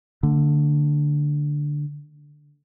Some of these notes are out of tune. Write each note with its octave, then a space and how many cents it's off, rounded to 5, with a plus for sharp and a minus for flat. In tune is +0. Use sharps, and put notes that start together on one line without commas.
D3 +0 A3 +35